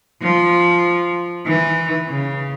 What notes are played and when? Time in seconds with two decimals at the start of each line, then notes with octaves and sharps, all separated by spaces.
0.22 F3
1.46 E3
2.09 C#3